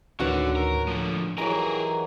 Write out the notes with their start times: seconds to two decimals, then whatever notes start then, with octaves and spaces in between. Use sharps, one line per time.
0.20 D2 A2 D3 D#3 C#4 F#4 B4
0.56 A#4
0.75 A2
0.88 D3 F3
1.38 D#3 E3 F#3 G4 G#4 A#5